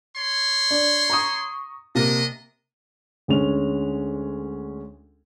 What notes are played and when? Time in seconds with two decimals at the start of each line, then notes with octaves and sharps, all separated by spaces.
0.16 C#5 C6
0.71 D4
1.10 A#5 C#6 D#6
1.95 C3 A#3 D4 D#5
3.28 D2 G#3 C#4 F7